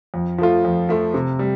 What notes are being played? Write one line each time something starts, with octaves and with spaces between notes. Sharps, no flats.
F2
F3 A3 F4
F2
F3 A3 F4
C3
G3